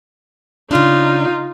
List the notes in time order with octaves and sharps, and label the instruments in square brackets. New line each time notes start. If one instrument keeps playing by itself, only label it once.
[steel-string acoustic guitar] C#3 D4 [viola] D#4 F4